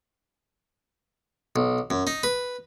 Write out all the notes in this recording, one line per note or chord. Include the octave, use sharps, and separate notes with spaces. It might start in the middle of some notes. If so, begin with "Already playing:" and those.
B1
F#2
D#4
B4